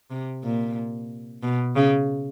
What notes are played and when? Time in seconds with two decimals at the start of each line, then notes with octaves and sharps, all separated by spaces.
0.11 C3
0.44 A#2
1.43 B2
1.76 C#3